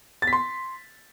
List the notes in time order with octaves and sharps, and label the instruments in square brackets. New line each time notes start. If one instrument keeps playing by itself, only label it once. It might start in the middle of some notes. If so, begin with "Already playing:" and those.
[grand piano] A6
B6
C6